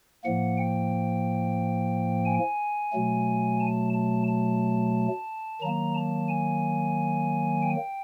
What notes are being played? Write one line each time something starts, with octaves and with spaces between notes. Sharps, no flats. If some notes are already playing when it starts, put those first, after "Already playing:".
A2 F3 A#3 F#5
G5
G#5
B2 F#3 A3
A5
A5
A5
D#3 F#3 A#3 A#5
A5
G#5
G5